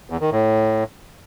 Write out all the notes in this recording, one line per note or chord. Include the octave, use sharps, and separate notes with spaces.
E2
D#3
A2